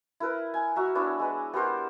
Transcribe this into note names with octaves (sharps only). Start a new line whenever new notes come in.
E4 A#4 B4
G#5
F#4 E5 A#5
B3 D4 E4 C#5
G#3 B4
B3 G4 A#4 C5